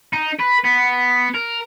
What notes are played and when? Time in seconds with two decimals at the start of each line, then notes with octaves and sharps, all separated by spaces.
0.13 D#4
0.40 B4
0.64 B3
1.35 A#4